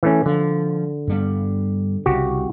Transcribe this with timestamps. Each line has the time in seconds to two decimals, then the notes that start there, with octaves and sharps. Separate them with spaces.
0.03 E3 A3 C#4
0.26 D3 F3
1.07 G2 G3 B3
2.06 C2 C#3 F#4 G4